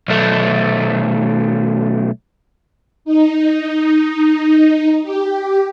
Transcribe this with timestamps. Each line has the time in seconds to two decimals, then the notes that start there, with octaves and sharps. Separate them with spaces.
0.08 B1 A3
3.05 D#4
5.03 G4